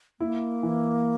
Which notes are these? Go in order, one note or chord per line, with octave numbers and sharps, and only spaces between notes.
A#3 E4
E3